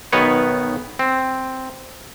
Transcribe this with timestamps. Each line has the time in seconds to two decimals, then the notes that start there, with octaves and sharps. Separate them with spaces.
0.12 B1 D#3 B3 B4 C#5
0.99 C4